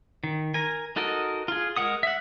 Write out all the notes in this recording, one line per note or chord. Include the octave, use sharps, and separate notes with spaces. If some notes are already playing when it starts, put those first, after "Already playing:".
D#3
A#4 G#5
D#4 F#4 A4 A#4 D#5
F4 G#4
G#3 A#4 F#5 D#6
E5 F#5